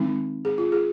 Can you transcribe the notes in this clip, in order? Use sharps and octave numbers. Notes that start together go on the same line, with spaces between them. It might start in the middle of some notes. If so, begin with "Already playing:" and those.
Already playing: D#3 G#3 C4 D#4
G#4
F4
G#4